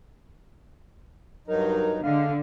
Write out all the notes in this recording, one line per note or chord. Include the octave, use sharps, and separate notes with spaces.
G2 F#3 D#4 A#4
D3 G#3 F5